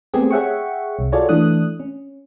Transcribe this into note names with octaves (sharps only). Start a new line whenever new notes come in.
A3 B3 C4 G4 G#4
G#4 C#5 E5 F#5 G5 C#6
C2
F4 F#4 G#4 A4 C#5 D5
E3 A3 D4 D#6 F#6
C#4